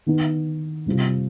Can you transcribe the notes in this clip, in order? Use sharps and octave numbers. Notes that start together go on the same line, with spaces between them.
D#3 B3 D#4
C3 G3 C4 F4